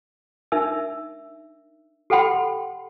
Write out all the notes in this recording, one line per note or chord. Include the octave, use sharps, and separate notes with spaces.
D4 D#4 A#4 E5 E6
G4 A4 F#5 G5 B5 C6